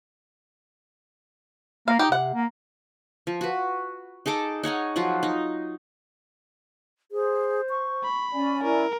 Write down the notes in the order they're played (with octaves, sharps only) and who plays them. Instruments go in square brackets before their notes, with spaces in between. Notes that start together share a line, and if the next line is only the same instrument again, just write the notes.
[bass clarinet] A#3 [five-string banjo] F5
[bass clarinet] D#4 [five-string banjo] G4
[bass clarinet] C3 [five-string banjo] F#5
[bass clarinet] A#3
[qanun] F3
F#4 B4
D#4 G#4 A4 D6
D#4 C#5 F#5 G#5
F3 F#3 F4 F#5
D#4
[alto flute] G#4 [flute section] C5
[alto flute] C#6
[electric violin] B5
[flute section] C#4 D5 G#5
[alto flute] E4 [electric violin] A#4